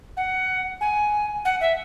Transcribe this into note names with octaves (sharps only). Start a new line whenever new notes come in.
F#5
G#5
F#5
E5